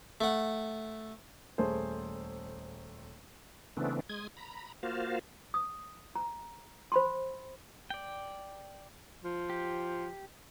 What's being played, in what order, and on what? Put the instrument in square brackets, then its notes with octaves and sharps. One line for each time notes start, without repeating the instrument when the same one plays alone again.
[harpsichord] A3 F#5
[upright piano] D#1 A3 G#4 C5
[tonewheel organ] C#3 E3 A3 B3 C4 D4
G#3 D#6 G#6
A#5 B5
A#3 F4 F#4 C5 F5
[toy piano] D#6
A#5
C5 B5 C6
[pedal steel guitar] D5 G5
[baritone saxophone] F3
[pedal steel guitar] G4